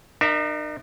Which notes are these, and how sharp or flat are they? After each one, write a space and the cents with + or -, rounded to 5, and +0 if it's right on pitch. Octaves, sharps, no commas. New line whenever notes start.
D#4 -45 A#4 +0 E5 +0